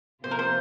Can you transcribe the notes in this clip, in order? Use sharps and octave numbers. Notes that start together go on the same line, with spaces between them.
C3 F3 A#3 F4 C5
A#4
C5